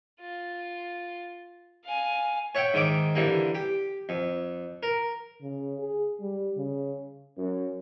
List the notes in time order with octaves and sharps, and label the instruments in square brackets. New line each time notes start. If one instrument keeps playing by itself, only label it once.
[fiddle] F4
F5 G#5
[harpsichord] C#5 E5 F#5 G5
G#2 D#3 E5 D6
D3 E3 G3 A#3
G4
F2
A#4
[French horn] C#3
G#4
G3
C#3
[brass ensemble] F#2